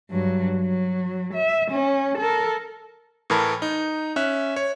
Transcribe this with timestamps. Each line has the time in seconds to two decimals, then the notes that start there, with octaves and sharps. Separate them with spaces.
0.11 G2 F#3
0.56 F#3
1.34 E5
1.71 C#4
2.18 A4 A#4
3.30 A2 E3 A#4 A5 B5
3.62 D#4
4.16 C#4 E5 F#6
4.56 C#5